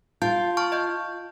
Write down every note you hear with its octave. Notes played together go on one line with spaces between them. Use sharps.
F4 A5 G6
A5 C#6 F6
D#5 A5 G6